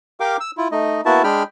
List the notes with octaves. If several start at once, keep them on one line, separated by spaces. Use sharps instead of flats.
G4 A#4 F5 G5 D6
E6
E4 F4
A3 D#4 D#5
A#3 B3 E4 F#4 E5 A5
G#3 D4 G#4 G5 B5 F6